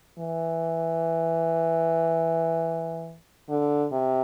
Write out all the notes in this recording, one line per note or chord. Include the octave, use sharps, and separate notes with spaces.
E3
D3
C3